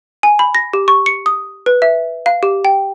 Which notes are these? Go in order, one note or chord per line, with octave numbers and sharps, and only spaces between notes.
G#5
B5
A#6
G4
C#6
C#7
D#6
B4
E5
F5
G4
G5